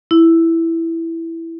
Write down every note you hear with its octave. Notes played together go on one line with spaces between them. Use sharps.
E4